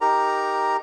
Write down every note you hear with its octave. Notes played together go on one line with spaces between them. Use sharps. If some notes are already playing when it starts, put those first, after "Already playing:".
D#4 G4 A#4 A#5